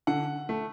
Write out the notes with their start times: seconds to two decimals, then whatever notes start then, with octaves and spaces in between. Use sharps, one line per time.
0.07 D3 F#5
0.49 A3